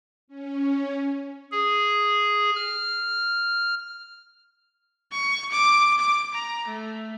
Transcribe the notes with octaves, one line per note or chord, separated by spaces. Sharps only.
C#4
G#4
F6
C#6
D6
D6
A#5
A3